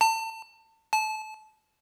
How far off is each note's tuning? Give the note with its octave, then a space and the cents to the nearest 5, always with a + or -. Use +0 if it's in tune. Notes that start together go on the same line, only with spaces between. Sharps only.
A5 +30
A5 -25